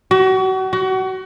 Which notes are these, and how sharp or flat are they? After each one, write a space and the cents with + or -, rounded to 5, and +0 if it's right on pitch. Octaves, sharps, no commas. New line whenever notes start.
F#4 +35
F#4 +30